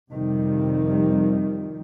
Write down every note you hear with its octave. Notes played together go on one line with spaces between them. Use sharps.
F2 C3 D#3 F3 G3